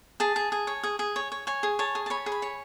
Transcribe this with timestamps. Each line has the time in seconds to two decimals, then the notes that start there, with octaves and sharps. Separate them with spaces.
0.20 G#4 A5
0.36 G#4
0.52 G#4
0.67 C#5
0.83 G#4
0.99 G#4
1.16 C#5
1.32 C#5
1.47 C#5 G#5
1.63 G#4
1.79 C#5 A5
1.95 G#4
2.06 A5
2.10 C#5 B5
2.26 G#4
2.32 B5
2.42 C#5